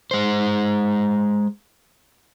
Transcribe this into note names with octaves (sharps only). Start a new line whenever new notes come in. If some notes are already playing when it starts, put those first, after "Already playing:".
G#3 C5